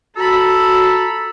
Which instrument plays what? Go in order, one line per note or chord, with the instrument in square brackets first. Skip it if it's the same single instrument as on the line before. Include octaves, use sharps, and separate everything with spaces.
[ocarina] F#4 [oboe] A4 [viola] A#5 B5